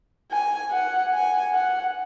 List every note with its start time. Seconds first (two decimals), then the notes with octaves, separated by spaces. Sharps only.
0.31 G#5
0.71 F#5
1.13 G#5
1.53 F#5